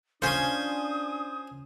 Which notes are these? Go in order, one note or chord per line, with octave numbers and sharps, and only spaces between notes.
C#4 D4 F4 C5 G#5 D#6